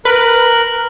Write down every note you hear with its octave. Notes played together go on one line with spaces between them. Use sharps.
A#4 B4 F#6